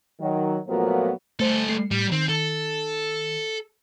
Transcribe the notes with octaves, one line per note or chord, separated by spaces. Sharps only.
D#3 F#3
A#2 F3 F#3 A3 B3 A#4
G3 A3 A4 C5
A3 C7
A2 G3
D#3 C4
A4